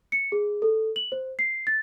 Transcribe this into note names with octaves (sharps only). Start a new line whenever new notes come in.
C#7
G#4
A4
F#7
C5
C7
A6